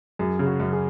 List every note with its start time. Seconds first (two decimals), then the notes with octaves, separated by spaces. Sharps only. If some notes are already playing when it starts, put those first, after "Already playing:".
0.19 F#2 G#4
0.39 C#3
0.46 F#4
0.60 F#2
0.73 G#4